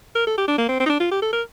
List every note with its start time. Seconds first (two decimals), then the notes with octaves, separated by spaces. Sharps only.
0.15 A#4
0.27 A4
0.38 G4
0.48 D4
0.58 A#3
0.69 C4
0.80 C4
0.86 D#4
0.90 D4
1.00 F4
1.11 G4
1.22 A4
1.33 A#4